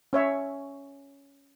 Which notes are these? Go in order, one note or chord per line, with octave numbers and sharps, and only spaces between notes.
C#4 C#5 E5